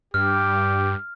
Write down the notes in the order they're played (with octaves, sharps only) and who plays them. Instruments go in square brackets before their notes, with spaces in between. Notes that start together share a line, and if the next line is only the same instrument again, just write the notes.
[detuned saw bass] G2 [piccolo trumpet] G4 [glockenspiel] F6